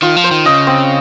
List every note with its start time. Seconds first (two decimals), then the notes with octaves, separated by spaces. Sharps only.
0.02 D#3 F4
0.16 F3
0.24 C5
0.31 D#3
0.45 C#3 D#5
0.67 C4